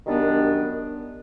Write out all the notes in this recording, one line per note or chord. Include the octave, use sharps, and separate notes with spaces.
F#2 D#3 G3 B3 D4